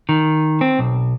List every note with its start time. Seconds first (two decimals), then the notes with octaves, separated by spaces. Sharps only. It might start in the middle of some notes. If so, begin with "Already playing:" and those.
0.09 D#3
0.61 C4
0.79 B1